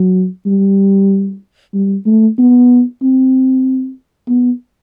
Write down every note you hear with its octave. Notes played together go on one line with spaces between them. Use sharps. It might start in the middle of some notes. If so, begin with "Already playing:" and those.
Already playing: F#3
G3
G3
A3
B3
C4
B3